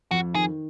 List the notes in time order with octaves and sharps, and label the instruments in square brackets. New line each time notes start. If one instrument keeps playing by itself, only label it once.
[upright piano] F2 [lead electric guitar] F#4
[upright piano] D#3 [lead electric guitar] G#4